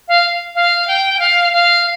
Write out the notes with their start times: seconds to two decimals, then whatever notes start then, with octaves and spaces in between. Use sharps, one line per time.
0.08 F5
0.55 F5
0.88 G5
1.14 G5
1.19 F5
1.53 F5